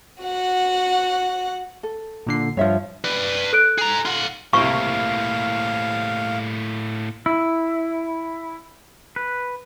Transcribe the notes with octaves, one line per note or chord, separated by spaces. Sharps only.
F#4 F#5
A4
A#2 D3 C7
G2 F3 C#5 E5 F5
B4 D5
A4 F#6 D7
G#4 A#5
F4 F#5
C2 A2 C3 A#3 F5 C#6
E4
B4